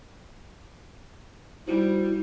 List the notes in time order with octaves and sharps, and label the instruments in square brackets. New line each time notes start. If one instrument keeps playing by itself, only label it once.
[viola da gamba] G3 [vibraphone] D#4 F#4 C5 [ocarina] E4